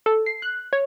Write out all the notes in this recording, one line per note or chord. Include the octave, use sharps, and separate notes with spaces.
A4
C7
F#6
C#5